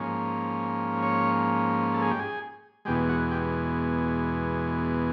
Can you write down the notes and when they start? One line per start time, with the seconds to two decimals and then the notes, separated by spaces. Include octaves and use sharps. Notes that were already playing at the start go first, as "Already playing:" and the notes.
Already playing: G#2 F3 A#3 C#4
1.03 C#5
1.94 A4
2.02 G#4
2.11 G4
2.20 G#4
2.85 E2 B2 G#3 G4
3.09 F#4
3.31 G4